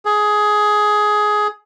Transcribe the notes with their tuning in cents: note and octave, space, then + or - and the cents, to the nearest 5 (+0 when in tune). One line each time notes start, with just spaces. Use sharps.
G#4 +15